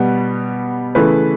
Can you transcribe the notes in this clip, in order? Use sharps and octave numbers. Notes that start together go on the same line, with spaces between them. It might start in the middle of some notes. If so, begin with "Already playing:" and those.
Already playing: B2 G3 B3
C#3 E3 A3 B4